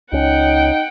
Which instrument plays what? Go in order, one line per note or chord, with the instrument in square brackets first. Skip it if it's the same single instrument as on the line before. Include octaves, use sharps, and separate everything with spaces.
[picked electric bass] C#2 C#4 [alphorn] D#4 [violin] F#5 G5